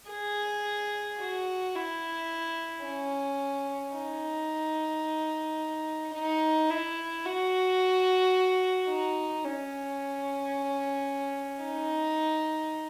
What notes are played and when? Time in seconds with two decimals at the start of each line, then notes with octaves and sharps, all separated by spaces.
0.11 G#4
1.21 F#4
1.76 E4
2.85 C#4
3.96 D#4
6.14 D#4
6.70 E4
7.25 F#4
8.90 D#4
9.44 C#4
11.64 D#4